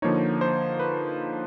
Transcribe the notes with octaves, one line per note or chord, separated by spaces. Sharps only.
D3 F3 A#3 D#4 C#5
C5
B4